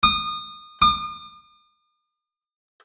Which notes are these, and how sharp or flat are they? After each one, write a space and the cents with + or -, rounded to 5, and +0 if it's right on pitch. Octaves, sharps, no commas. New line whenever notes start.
D#6 -25
D#6 -45